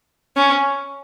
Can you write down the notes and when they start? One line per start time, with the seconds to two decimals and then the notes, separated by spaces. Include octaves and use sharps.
0.36 C#4